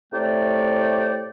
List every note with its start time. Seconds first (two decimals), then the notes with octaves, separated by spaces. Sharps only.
0.13 A2 C3 A3 C#5 D5 G5